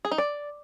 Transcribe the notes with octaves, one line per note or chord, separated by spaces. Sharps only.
G#4
D#4
D5